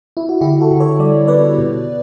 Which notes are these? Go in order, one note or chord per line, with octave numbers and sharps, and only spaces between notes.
E4
F#4
D3 E4 G4
F#4 A4
D3
A4 C#5
G3 D5
B3 B4 D5
B2